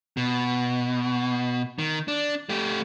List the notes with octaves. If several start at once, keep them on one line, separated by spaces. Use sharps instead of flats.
B2
D#3
D4
A3 G4